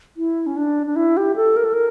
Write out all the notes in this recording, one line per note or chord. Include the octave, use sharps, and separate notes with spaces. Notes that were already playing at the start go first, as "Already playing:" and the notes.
E4
C#4
D4
D4
E4
G4
A4
A#4
A4
A#4